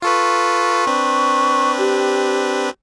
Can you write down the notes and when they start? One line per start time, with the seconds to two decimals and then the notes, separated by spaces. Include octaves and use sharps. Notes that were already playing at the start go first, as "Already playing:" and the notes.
0.02 F4 A4 B4 C#6
0.87 C4 D4 B4
1.78 G4